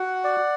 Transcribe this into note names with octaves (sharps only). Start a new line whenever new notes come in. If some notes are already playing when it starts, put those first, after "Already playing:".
Already playing: F#4 F#5
D5